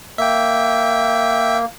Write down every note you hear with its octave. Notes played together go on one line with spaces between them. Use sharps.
A#3 E5 G5